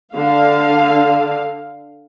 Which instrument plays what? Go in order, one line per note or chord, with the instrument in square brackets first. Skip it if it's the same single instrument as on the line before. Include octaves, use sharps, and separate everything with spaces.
[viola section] D3 F5